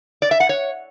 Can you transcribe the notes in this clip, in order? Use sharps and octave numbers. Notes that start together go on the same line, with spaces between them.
D5
E5
F#5
C#5